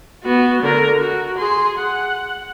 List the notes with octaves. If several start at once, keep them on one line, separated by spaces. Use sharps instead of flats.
B3 F#4
D3 A#4
F#4
G#4 C6
F#5